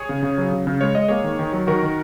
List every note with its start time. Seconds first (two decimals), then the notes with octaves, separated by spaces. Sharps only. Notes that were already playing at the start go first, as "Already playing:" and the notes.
Already playing: G#4 C#5
0.09 C#3
0.23 C#3
0.38 F#3
0.52 C#3
0.67 C#3
0.81 G#3 C#5
0.95 G#3 D#5
1.08 A#3 G#4 C#5
1.24 D#3
1.39 D#3
1.53 F#3
1.67 D#3 F#4 A#4
1.82 D#3